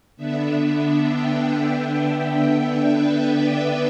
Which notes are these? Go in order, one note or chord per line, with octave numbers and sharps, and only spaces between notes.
D3 B3 D4 E5
G5
E5
E5
B4
D5